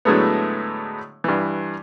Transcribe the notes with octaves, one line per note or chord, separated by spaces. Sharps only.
A2 D3 F#3 G#3 A3 B3
G2 E3